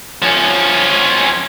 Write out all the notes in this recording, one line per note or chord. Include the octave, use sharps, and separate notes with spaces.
F3 C#4